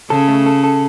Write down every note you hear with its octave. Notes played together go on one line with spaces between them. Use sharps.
C#3 A4
A3
A4
A4